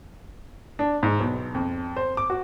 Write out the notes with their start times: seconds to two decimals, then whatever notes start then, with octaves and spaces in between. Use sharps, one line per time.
0.79 D4
1.03 G#2
1.20 B1
1.55 F2
1.96 C5
2.17 D6
2.30 F#4